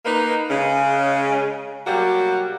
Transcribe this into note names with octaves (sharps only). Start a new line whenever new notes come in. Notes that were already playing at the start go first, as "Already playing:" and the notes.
A#3 D#4 B4
C#3 G#3 C#4
B2 F#3 G3 A#3 F#4 G4